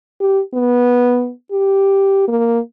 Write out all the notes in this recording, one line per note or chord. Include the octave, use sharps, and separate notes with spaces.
G4
B3
G4
A#3